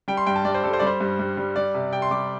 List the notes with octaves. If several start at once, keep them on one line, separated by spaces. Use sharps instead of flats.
G3 G5
C6
G2 G5
A5
G2 D5
C5
G3 A4
C5
G3 D5
C5
G2
G2
G3
G3 D5
C3
C3 G5
C6
G3 D6